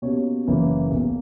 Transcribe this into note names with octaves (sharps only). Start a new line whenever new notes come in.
B2 A#3 C#4 G4 C#5
F#1 F#2 E3 A#3 C#4
B1 B2 A#3